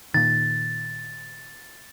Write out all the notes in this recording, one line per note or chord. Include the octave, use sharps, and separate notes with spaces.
A#2 D#3 A6